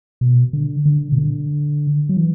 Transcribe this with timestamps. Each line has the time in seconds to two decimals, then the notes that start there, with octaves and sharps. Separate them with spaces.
0.21 B2
0.53 D3
0.86 D3
1.12 B2
1.18 D3
2.09 F#3
2.17 E3